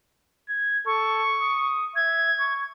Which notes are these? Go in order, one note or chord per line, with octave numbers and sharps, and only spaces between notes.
G#6
A4 C#6
D#6
E5 G#6
C#6